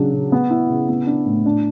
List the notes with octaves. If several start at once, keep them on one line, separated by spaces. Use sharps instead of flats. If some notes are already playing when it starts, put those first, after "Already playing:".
Already playing: C#3 F#3 D4
C#3
B3
E4
C#3
B3
D4
A2
D4